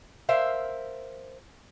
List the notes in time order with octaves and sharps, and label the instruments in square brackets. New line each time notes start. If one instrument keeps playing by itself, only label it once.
[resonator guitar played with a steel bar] A#4 C5 E5 F5